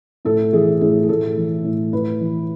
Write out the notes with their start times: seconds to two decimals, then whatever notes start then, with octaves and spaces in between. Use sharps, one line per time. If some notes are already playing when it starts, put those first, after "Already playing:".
0.25 A2 A4
0.53 E3 G#4
0.81 A2 G#4
1.03 G#4
1.09 A2 A4
1.37 E3
1.64 A2
1.93 A2 B4
2.21 E3